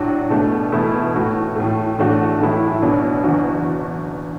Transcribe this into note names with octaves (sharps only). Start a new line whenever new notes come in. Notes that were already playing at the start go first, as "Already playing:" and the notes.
Already playing: A2 F#3 D4 F#4
B2 A3 D4
E2 B2 A3 E4
A2 A3 F#4
A2 E3 A3
A1 A2 A3 D4 F#4
B1 A2 E3 A3 E4
B2 F#3 D4 F#4
F#1 E2 E3 D4 F#4